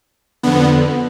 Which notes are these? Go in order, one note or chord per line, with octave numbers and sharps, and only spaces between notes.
F2 D3 B3